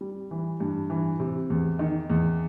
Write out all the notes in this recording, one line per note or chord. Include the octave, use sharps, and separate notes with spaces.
G3
E3
G2
E3
C3
E2
D#3
E2